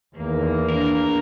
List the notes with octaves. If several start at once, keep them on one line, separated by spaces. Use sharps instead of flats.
E2 D#3 A#3
D4 A#4